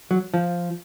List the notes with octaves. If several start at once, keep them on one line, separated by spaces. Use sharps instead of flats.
F#3
F3